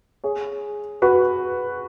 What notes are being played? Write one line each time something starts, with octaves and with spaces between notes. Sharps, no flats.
G#4 C#5
F#4 B4